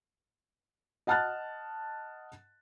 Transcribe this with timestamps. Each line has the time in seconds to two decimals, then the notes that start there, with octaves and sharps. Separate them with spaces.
1.07 D#5 F#5 A5 F6 F#6 A6